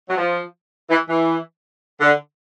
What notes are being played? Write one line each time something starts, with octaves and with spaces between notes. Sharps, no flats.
F#3
F3
E3
E3
D3